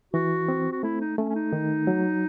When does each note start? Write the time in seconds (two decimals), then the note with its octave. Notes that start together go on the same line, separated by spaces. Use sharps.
0.14 E3 F#4
0.49 C4
0.72 F#4
0.83 A3 E4
1.00 D#4
1.18 A3 C#4
1.29 C#4
1.35 D#4
1.53 D#3
1.87 F#3